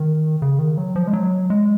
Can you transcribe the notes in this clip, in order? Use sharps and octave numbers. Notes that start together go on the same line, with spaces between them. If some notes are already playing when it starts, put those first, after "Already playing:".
Already playing: D#3
C#3
D#3
F#3
F3
G#3
F#3
G#3